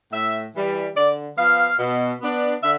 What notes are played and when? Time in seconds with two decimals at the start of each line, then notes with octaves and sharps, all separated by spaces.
0.12 A2 E5
0.53 E3 G3
0.96 D3 D5
1.37 F3 B3 F5
1.79 B2
2.21 B3 D4
2.63 D3 E5